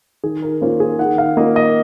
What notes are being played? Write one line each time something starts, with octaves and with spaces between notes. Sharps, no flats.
D#3 G#4
A#4
A#3 C#4 F4 C5
G#4
D#3 F#5
F5
A#3 C#4 F4 D#5
D#5